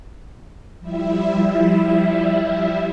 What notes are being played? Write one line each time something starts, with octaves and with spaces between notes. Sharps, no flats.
F3 G3 E4 E5